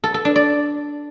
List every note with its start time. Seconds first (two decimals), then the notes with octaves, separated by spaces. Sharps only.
0.04 A4
0.14 A4
0.25 D4
0.36 D5